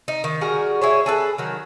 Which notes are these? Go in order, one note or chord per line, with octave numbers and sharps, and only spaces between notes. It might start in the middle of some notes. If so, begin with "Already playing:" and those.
D#4
D#3
G3 F#4 G#4 A#4
E4 G#4 C#5
G#4 A4 B4
D#3 F#3